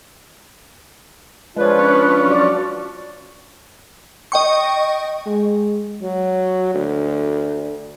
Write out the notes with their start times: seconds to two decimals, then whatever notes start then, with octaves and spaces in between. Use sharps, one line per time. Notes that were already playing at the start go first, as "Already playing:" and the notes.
1.56 F3 G#3 D4 F4 B4 C#5
1.79 C#4
2.27 F#3 D5
4.32 D#5 G5 C#6
5.26 G#3
6.02 F#3
6.74 D2